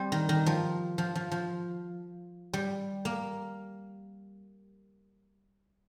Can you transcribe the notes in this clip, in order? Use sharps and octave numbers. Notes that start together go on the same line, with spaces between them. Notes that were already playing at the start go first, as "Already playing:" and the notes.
Already playing: G3 C4
D#3
D#3
F3
F3
F3
F3
G3
A#3